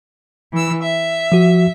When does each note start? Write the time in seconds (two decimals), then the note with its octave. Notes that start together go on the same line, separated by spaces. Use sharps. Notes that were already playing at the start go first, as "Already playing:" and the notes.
0.52 E3 E6
0.82 E5
1.32 F3 F#4